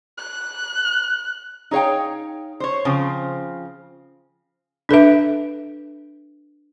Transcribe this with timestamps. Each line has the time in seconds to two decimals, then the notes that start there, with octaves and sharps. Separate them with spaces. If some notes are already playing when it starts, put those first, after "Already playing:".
0.18 F#6
1.71 D#4 G#4 C#5 F5 G5
2.60 C5 C#5
2.85 C#3 F3 C4
4.89 D4 A4 B4 E5